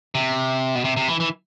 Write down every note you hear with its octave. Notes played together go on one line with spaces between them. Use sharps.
C3
B2
C3
C3
E3
E3